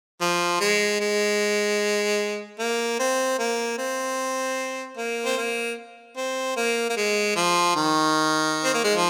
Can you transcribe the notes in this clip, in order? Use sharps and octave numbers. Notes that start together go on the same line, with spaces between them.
F3
G#3
G#3
A#3
C4
A#3
C4
A#3
C4
A#3
C4
A#3
A#3
G#3
F3
D#3
C4
A#3
G#3
F3